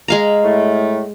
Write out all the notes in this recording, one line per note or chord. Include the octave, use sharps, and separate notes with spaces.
G#3 F5 A#5
A2 A3